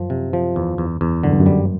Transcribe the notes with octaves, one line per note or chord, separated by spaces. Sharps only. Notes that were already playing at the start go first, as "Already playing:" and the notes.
Already playing: F#2 F3
C3
F3
E2
E2
E2
F#2 D3
G2
F#2
G3